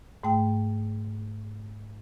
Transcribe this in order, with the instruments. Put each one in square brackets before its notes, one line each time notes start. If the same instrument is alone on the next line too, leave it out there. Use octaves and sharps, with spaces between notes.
[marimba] G#2 A3 G5